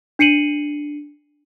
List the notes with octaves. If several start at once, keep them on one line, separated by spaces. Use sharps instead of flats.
D4 C7 C#7 D#7 F#7